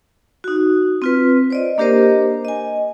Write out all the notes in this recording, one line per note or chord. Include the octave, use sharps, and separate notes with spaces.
D#4 F#4
C4 F4 B4
C5 D5 D#5
A#3 D4 G4 A#4 C5 D#5
D#5 G#5